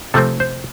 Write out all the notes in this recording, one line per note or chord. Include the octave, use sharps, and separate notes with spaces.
C3 F3 A3 C4 A4
C5